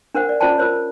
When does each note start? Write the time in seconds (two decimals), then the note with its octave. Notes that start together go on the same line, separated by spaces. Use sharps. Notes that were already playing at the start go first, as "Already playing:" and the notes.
0.15 D4 A#4 C5 F#5
0.29 D5
0.40 C#4 F4 C5 D5 G5 A5
0.58 F4 A#4 C5 C#5